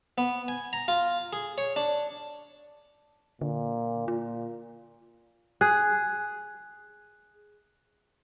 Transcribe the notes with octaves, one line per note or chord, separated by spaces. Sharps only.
B3
G#5
A#5
F4
G#4
C#5
D4
A#2 D3
A#2 F4
G#4 F#6